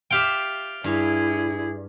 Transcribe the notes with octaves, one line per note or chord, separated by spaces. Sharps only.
F4 G4 E5 F5 G5
G2 E4 G#4